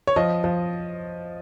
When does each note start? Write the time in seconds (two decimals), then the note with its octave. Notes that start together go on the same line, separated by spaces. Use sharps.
0.07 C#5
0.16 F3 D#5
0.44 F3